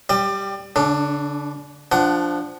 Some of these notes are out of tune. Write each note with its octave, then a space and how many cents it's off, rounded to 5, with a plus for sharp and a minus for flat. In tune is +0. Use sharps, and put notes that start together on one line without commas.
G3 +0 D5 +30
D3 -40 D4 +10
F3 +0 D4 +0 F#5 +20